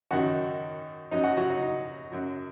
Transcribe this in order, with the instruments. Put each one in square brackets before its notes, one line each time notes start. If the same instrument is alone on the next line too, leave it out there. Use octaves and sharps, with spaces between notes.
[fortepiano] F#2 D#3 F#3 F#4 F#5
F#2 F#3 D#4 D#5
F#4 F#5
F#3 F#4
D#4
D#4
F#2 F#3